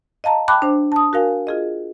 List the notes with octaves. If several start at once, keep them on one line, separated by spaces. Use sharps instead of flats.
D#5 F5 A5 A#5
G5 A5 B5 D6 F#6
D4 C5
A5 D#6
F#4 A#4 F5 G#5
F4 G#4 D#5